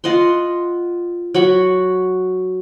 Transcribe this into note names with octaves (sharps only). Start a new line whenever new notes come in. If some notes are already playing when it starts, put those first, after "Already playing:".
F4 D#5 F#5 C6
F#3 F#4 B5 C#6